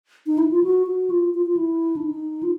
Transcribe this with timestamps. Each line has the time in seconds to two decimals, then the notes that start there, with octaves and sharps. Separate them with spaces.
0.27 D#4
0.38 E4
0.51 F4
0.64 F#4
0.87 F#4
1.10 F4
1.34 F4
1.46 F4
1.57 E4
1.96 D4
2.03 D#4
2.43 F4